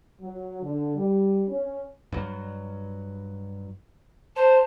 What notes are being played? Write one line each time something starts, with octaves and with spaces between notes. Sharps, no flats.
F#3
D3
G3
C#4
G2 F#3
C5 A5